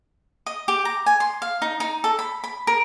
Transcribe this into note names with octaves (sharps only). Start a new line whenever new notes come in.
D#5
G4
A#5
G#5
C6
F5
D#4
D#4
A4
B5
B5
A#4